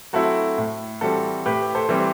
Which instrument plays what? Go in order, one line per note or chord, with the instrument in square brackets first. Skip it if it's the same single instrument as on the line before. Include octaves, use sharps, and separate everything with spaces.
[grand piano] F#3 A3 C4 E4 F#4 A4
A2
E3 G3 C4 F#4 A4
A2 G4 B4
A4 C5
E3 G3 C4